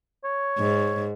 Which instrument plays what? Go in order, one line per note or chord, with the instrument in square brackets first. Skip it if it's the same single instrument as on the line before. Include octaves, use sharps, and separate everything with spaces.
[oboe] C#5
[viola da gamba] G#2